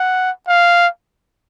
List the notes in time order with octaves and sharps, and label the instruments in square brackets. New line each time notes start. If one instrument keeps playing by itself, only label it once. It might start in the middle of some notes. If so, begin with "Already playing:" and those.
Already playing: [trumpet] F#5
F5